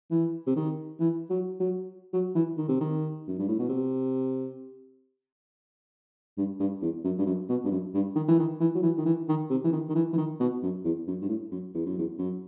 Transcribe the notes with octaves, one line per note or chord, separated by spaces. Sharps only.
E3
C3
D#3
E3
F#3
F#3
F#3
E3
D#3
C3
D#3
F#2
G2
A2
B2
C3
G2
G2
E2
F#2
G2
F#2
B2
G2
F#2
G2
D#3
E3
D#3
E3
F#3
E3
D#3
E3
D#3
C3
E3
D#3
D#3
E3
E3
D#3
B2
F#2
E2
F#2
G2
A2
F#2
E2
F#2
E2
F#2